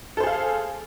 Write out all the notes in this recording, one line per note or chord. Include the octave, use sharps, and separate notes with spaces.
G#4 A4 C5 F5